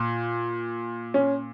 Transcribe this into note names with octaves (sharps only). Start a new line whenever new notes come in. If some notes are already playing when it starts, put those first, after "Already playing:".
Already playing: A#2
C#4